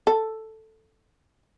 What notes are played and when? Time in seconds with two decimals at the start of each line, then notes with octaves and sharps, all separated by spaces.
0.07 A4